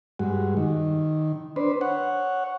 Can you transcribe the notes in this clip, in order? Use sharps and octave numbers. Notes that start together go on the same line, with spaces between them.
G2 G#3 F#4
D#3
D4 B4 C5
C#5 F#5